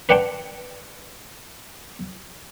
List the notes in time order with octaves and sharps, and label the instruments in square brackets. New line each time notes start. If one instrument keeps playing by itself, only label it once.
[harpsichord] B4 D5 F#5 G5 A5 C6